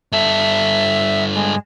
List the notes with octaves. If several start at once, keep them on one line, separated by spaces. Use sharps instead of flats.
G2 A4 E5
G#3